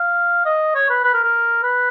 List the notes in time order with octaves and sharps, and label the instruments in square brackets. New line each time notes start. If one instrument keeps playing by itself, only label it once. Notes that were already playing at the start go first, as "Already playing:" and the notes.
Already playing: [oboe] F5
D#5
C#5
B4
B4
A#4
A#4
B4